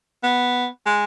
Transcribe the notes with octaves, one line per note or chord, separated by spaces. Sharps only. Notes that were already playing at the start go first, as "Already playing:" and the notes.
B3
G#3